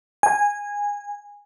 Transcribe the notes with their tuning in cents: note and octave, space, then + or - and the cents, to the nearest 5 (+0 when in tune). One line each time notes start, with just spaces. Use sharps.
G#5 -15